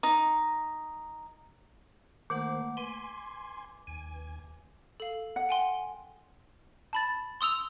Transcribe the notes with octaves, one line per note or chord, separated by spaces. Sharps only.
D#4
D#3 A3 A#3 C5 F#5 D6
B4 G#5 C6
D#2 G#5
A4 F5
F#5
G5 G#5 C6
A5 B5 A6
C6 D#6 E6 F7